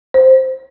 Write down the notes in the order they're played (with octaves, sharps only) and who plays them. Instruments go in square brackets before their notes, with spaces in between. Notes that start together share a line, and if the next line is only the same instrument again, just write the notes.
[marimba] C5